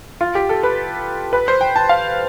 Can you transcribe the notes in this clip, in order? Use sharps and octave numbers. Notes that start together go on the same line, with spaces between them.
F4
G4
A4
B4
B4
C5
G5
A5
F5